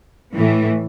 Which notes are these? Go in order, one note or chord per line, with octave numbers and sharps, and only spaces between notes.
A2 E3